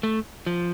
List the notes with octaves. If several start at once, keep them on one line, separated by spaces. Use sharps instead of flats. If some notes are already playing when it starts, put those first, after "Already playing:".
A3
F3